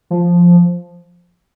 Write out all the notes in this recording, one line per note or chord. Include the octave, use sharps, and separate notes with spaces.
F3